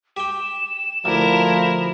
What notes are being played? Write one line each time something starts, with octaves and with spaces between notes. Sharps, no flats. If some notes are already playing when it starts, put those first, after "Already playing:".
G4 G5 E7
D2 F3 E4 A#4